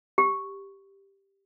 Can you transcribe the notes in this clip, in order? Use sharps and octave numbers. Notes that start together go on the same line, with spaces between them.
G4